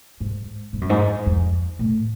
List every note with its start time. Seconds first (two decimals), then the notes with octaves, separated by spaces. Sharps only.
0.20 G#2
0.73 G#2
0.81 F#2
0.90 G#2
1.26 F2
1.79 A2